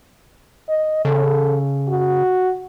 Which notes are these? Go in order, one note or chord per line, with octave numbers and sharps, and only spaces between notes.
D#5
C#3 A4
F#4